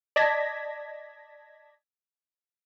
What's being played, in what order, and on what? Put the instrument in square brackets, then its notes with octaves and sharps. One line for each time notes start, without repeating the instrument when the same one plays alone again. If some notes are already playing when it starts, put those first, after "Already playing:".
[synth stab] D5 D#5 A5 G#6 A#6 B6